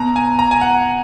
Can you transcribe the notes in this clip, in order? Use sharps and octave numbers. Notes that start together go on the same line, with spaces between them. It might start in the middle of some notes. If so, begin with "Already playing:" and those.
Already playing: B2 A#5
G#5
A#5
G#5
F#5